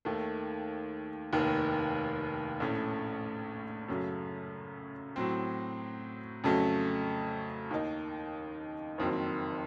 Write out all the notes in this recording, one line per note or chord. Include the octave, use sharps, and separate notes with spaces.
D#2 D#3 A3
F1 D#2 D#3
A#1 A2 A3 C#4
F#2 C#3 F#3 A3 C#4
A2 F#3 C4
F2 C#3 F#3 A3 C#4
D#2 D#3 A#3 D#4
F#1 F2 D#3 F#3 C4